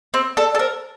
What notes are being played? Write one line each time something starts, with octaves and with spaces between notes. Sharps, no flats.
C4
A4 D5
D5
A4
A#4 C5